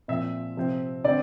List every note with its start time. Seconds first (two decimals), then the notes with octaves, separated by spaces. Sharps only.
0.08 A#2 F3 C4 E5
0.57 C3 F3 C4
1.04 D3 A3 C4 D5